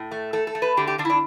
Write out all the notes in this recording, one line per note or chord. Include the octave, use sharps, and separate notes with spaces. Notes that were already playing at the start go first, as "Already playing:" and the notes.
Already playing: A2
A3
A3 A4
A4
A3
B4
D3 G4
G4
D3 D4
E4
D4